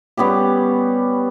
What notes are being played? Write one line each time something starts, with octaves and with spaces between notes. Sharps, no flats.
G3 B3 C#4 G4